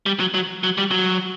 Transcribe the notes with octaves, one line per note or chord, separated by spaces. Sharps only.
G3
F#3
F#3
F#3
G3
F#3